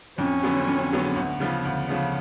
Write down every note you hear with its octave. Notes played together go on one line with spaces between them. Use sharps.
F2 C#4
D3 F#3 B3
F2
D3 F#3 B3
D2
C#3 F3 B3
D2
C#3 F3 B3